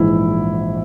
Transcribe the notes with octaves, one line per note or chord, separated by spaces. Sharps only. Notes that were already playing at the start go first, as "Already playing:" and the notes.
Already playing: A#1 G#2 E3 E4